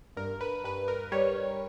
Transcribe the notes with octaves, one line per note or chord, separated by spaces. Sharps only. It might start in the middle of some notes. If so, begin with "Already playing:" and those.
G2 A#4
B4
G2 B4
A#4
G3 C#5